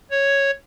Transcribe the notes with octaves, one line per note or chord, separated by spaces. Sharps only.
C#5